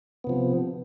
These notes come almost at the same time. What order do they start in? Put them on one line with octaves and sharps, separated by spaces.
B3 C3 F3